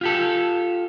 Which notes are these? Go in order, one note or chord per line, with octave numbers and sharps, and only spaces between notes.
F4 G4 A4